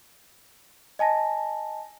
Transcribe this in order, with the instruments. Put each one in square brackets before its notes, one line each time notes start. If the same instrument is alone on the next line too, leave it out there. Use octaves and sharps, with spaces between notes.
[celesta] D#5 G#5 A5 A#6